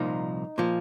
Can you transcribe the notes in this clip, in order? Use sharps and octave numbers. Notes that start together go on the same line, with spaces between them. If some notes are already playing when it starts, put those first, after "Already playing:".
Already playing: C2 A#2 F3 D#4
A#2 F3